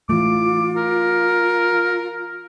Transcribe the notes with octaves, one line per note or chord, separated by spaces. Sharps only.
E3 A3 F4 D6
A#4